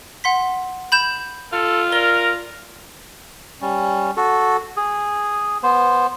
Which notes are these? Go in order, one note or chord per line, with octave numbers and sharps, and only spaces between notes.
F#5 C6 B6
B5 G6 E7
F4 A4
A#4 D5 G7
G3 C#4
F#4 A4
G#4
B3 C5